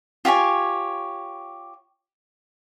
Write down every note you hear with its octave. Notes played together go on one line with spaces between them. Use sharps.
F4 G4 C#5 G#5